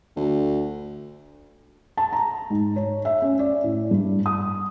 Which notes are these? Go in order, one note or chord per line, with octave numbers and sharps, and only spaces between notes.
D2
A5
A#5
G#2
C#5
E5
C#4
D5
A2
G2
D#6